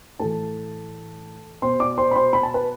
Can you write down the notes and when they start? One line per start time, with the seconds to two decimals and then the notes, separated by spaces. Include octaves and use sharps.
0.19 A2 E3 A4 A5
1.62 B2 C5 C6
1.80 D5 D6
1.98 C5 C6
2.11 B5
2.16 C5 C6
2.33 B5
2.43 A5
2.54 B4 B5